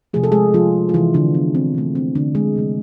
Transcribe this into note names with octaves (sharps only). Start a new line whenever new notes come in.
C3 F3 A3 G#4
A4
G#3 G#4
F3 F4
F4
C3 E3 F3 A3 E4
D3 D4
B3
C4
C3 F3 A3
C4
D3 D4
G#3 G#4
C3 F3 A3